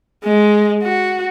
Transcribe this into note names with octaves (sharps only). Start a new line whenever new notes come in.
G#3
F#4